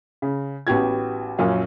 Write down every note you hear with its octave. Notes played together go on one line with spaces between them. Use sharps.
C#3
A1 B3 F#4 G4 G#6
F#2 A#2 F3 F#3 C#4 F5